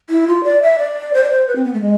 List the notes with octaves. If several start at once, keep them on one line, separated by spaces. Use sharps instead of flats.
E4
F4
D5
E5
D5
C5
D5
C5
B4
C4
B3
A3
G#3